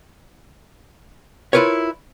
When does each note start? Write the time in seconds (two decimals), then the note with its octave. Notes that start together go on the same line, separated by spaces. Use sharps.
1.53 E4 F4 A#4 B4 C#5